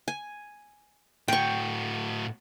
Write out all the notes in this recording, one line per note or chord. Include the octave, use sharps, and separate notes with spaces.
G#5
A2 F#4 G5 C#6